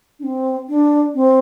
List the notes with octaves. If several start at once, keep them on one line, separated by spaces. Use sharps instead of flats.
D4
C4
D4
C4